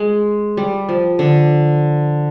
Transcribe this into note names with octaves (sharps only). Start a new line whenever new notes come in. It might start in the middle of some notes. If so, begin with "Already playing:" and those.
Already playing: G#3
G3
F3
D3